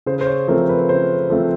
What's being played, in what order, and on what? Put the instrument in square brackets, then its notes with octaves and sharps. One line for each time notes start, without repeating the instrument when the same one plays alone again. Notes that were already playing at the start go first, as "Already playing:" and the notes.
[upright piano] C#3 C5
C5
C#5
F3 A3 C4 A#4
B4
C#3 C5
F3 A3 C4